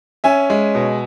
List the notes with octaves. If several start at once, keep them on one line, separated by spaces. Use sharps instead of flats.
C#4 E5 G#5
G#3
B2